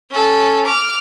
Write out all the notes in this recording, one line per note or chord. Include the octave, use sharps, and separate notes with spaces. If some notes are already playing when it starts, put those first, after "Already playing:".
C#4 A4
D6 F6